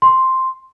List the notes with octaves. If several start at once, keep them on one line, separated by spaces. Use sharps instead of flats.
C6